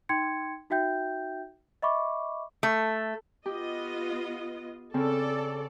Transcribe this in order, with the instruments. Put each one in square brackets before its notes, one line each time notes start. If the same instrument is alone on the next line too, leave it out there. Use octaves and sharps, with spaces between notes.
[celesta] D#4 G5 C6 G#6 C#7
D#4 F#4 E5 G5 G6
D#5 E5 B5 C#6 D6
[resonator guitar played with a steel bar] A3
[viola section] B3 F4 D#5 [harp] G4
[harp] C#3 C4 [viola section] A4 D5